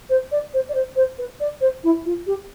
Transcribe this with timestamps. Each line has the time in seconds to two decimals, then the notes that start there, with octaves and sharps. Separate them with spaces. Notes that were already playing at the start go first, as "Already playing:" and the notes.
0.09 C5
0.31 D5
0.53 C5
0.68 D5
0.74 C5
0.95 C5
1.18 B4
1.40 D5
1.60 C5
1.83 E4
2.05 F4
2.26 G4